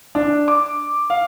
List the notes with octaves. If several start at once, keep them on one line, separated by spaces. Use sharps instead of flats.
D4
D6
F5